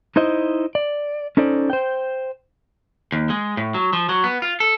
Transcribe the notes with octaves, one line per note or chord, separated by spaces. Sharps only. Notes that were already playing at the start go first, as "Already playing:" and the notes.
D#4 E4 C5 D#5
D5
C#4 D#4 A4 C5 D5
C5 G5
D#2
G#3
A2
F#3
F3
F#3
B3
F4
A4